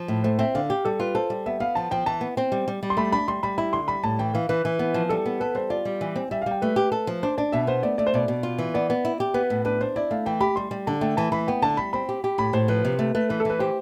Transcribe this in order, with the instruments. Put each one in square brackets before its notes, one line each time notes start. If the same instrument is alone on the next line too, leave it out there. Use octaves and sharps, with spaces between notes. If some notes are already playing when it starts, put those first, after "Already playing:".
Already playing: [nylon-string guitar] F3
A2
[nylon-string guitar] A3 [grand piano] C5
[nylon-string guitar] C4 [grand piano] E5
[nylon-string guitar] D3 [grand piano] F5
[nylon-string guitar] G4
[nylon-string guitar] G3 [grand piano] A4
[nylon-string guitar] F4 [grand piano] B4
[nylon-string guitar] A4 [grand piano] C5
[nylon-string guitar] G3
[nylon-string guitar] B3 [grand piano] E5
[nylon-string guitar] B3 [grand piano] F5
[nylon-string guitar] F3 [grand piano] A5
[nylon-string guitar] F3 [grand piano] G5
[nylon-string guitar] E3 [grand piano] A5
[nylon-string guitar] B3
C4
G3
G3
G3
[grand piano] C6
[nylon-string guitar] A3 [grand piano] B5
[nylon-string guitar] D4 [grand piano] B5
[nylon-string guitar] G3 [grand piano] C6
[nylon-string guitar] G3 [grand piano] B5
[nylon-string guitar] E4 [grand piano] B5
[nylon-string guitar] D3 [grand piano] C6
[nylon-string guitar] G3 [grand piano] B5
[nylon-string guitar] A2 [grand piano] A5
[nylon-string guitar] E3 [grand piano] G5
[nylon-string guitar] E3 [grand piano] F5
[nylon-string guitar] E3 [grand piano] B4
[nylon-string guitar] E3
[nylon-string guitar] B3 [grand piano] B4
[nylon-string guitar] F3
[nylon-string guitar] G3 [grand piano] A4
[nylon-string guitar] B3
[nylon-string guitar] A4 [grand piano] B4
[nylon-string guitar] G3 [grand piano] C5
[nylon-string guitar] F4 [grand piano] D5
[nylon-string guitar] G3
E3
C4
[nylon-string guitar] G3 [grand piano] E5
[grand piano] F5
[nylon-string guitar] G3 [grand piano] G5
[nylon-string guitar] A3 [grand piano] B4
[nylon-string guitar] G4
A4
F3
[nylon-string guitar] D4 [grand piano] C5
[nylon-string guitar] D4 [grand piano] D5
[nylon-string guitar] B2 [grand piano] E5
[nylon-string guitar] B3 [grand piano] C5
[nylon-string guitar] A3 [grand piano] D5
[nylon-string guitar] A3 [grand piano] D5
[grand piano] C5
[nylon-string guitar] B2 [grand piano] D5
[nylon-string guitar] B2
F4
E3
[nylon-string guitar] B3 [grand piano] D5
[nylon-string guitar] B3
E4
G4
[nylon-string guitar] B3 [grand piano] B4
[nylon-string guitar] A2
[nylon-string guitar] D4 [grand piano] B4
[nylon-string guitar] D4 [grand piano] C5
[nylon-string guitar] E4 [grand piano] D5
[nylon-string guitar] A3 [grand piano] F5
[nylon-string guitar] E3 [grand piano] G5
[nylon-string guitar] G4 [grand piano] B5
[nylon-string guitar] G3 [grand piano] C6
[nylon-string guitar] G3
[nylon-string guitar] D3 [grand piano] A5
[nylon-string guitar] A3 [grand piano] G5
[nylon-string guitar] E3 [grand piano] A5
[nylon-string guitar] E3 [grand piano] B5
[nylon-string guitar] B3 [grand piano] G5
[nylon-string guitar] D3 [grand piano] A5
[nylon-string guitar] G3 [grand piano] B5
[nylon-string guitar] C4 [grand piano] B5
[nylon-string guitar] G4
G4
[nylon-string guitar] A2 [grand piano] B5
[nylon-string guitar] A2 [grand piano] C5
[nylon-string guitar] F3 [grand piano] B4
[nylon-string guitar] C3
[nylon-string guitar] A3 [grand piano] B4
[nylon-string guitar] A3 [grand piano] B4
[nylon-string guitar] E3 [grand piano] B4
[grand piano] A4
[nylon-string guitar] E3 [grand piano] B4
[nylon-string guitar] G4 [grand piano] C5